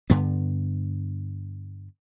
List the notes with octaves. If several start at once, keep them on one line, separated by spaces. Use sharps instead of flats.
G2 D3 B3